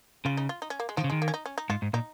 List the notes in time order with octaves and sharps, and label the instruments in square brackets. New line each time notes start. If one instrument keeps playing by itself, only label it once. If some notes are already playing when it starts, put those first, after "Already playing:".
[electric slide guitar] C#3 [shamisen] F4
[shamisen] D#4
F4
D#4
C#4
A#3
G#3
[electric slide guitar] D#3 [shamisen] F3
[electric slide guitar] C#3
[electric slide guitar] D#3 [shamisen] G#3
[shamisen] A#3
C#4
D#4
C#4
D#4
[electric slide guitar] G#2 [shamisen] F4
[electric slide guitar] G#2
[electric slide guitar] A#2 [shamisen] D#4